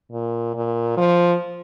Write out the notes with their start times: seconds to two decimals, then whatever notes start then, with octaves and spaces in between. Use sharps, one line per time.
0.12 A#2
0.55 A#2
0.97 F3